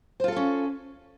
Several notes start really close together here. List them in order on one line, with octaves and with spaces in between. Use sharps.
C5 F4 A4 F5 C#4